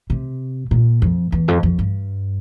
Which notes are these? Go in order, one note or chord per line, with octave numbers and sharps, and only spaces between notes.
C3
A#2
F2
E2
F2
F2
G2